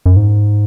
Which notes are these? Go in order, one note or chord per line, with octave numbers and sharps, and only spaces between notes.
F#2
G#2